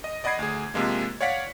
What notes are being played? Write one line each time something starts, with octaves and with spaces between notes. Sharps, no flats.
D#5
D5 D#5 F#5 B5 G#6 C7
D2 G#4
C3 F3 G#3 A#3
C#5 D5 F5 F#5 B6 C#7